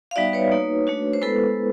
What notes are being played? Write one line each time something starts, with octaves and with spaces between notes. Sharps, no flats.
F5
G3 B3 D#4 F#4 D5 E5
B4 C#5
A#3 D#4 F#4
A3 D4 F#4
C5
G#3 B3 E4 A4 B4